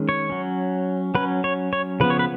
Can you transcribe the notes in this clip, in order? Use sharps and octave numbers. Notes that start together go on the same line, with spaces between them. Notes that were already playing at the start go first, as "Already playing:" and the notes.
Already playing: D#3 G#3 C#4
C#5
F#3 C#4
F#3 C#4 B4
C#5
C#5
C#3 F3 B3 B4
C#5
B4